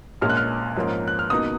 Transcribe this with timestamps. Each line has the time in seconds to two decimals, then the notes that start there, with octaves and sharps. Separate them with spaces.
0.21 A#1 A#2 G#3 C#4 F6
0.30 F#6
0.37 F6
0.76 G#2 F3 A#3 C#4
1.08 F#6
1.19 F6
1.30 C#2 B2 A#3 D#4 D#6